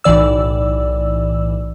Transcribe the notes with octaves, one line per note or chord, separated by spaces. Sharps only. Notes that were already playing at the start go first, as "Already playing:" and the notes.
B1 A2 E3 D5 E6